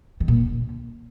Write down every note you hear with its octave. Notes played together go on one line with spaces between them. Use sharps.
D#3
A#2
D3